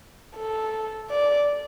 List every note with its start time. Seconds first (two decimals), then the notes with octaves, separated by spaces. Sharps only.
0.37 A4
1.11 D5